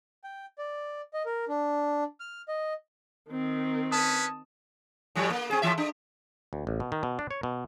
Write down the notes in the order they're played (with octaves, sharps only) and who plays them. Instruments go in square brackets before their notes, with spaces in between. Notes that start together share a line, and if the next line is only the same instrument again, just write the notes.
[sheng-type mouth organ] G5
D5
D#5
A#4
D4
F6
D#5
[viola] D#3 C4
[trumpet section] C#4 B4 [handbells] A5 D#6
[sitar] A2 F3 G3
A#3
C4 G#4
A2 E3 E5
D4
[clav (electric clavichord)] D2
A1
B2
D#3
B2
D4
C#5
B2